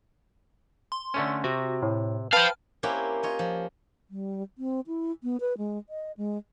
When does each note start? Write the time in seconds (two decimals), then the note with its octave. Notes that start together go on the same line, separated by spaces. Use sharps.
0.92 C6
1.14 D3 A3 C#4
1.44 C3 F#4
1.82 A2
2.33 B4 C5 F5 G5 A5 F6
2.83 A#3 C4 C#4 E4 G4 F#5
3.23 F4 C#5 D#5
3.39 F3
4.10 G3
4.58 C4
4.87 E4
5.23 B3
5.40 B4
5.58 G#3
5.89 D#5
6.17 G#3